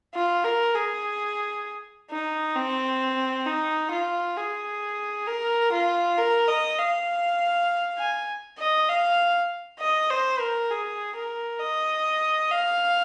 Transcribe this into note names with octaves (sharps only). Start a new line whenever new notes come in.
F4
A#4
G#4
D#4
C4
D#4
F4
G#4
A#4
F4
A#4
D#5
F5
G#5
D#5
F5
D#5
C5
A#4
G#4
A#4
D#5
F5